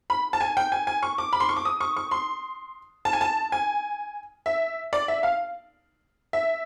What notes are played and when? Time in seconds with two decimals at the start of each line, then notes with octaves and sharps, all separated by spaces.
0.10 B5
0.33 A5
0.41 G#5
0.57 G5
0.72 G#5
0.87 G#5
1.03 C#6
1.18 D6
1.33 B5
1.40 C6
1.49 C#6
1.57 D6
1.65 D#6
1.81 C#6
1.97 C#6
2.11 C6
3.05 A5
3.13 G#5
3.21 A5
3.52 G#5
4.46 E5
4.93 D5
5.08 E5
5.23 F5
6.33 E5